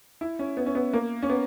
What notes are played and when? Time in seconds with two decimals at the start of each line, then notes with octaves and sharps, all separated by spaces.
0.21 E4
0.39 C#4
0.57 B3
0.66 C#4
0.75 B3
0.93 A#3
1.23 C#4
1.30 B3